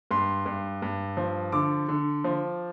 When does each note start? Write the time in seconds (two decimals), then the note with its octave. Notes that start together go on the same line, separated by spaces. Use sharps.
0.11 G2 C6
0.46 G2
0.82 G2
1.17 F3
1.52 D3 D6
1.88 D3
2.24 F3